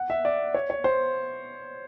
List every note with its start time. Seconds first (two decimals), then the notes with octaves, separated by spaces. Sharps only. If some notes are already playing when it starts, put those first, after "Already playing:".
Already playing: F#5
0.10 E5
0.25 D5
0.54 C#5
0.70 C#5
0.84 C5